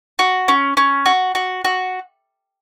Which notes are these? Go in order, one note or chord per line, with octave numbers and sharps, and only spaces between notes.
F#4
C#4
C#4
F#4
F#4
F#4